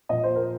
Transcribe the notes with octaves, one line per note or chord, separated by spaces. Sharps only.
A#2 F3 A#3 D#5
C5
A#4